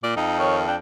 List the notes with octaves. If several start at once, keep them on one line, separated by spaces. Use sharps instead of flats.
A#2 D5
F2 D#4
D#3 C#5
D4 G5